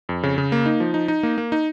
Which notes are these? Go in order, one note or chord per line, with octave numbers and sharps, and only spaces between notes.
F2
C#3
C#3
A#3
D#4
F3
D#4
D#4
A#3
A#3
D#4